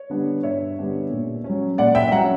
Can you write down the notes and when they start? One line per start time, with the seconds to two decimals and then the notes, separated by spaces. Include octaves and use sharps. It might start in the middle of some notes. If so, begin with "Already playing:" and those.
Already playing: C#5
0.10 D3 G3 B3 D4
0.43 G2 C#5 E5
0.77 D3 G3 B3 D4
1.11 A#2
1.44 C#4
1.49 F#3
1.78 A#2 D5 F#5
1.95 E5 G5
2.12 F#3 C#4 F#5 A#5